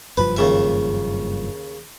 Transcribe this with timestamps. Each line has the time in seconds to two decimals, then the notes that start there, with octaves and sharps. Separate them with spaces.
0.17 F#1 G2 F3 B4
0.37 D#2 C#3 E5